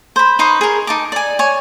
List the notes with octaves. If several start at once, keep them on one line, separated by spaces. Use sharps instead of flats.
C5 B5
D#4 B4 C5 C#6
G#4 A#4
D#4 A5 D6
D5 G#5
C#5 G#5